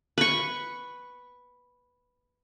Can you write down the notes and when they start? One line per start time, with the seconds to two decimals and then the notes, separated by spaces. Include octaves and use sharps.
0.18 B4 C#6